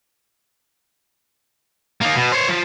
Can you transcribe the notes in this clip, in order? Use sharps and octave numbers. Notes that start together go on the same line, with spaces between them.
A#3 D#4
B2
C5 C#5
F3